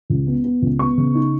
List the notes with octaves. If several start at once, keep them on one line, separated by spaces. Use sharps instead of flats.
C#2
B3
B3
C#2
B3 C#6
C#3
D#4